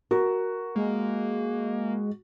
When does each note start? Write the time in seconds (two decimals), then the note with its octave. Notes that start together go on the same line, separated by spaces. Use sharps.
0.11 F#4 A#4
0.75 G#3 A#3